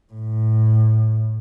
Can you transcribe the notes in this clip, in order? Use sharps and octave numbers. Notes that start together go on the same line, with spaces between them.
A2